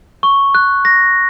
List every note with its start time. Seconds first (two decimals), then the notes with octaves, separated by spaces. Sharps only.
0.23 C#6
0.55 F#6
0.85 A#6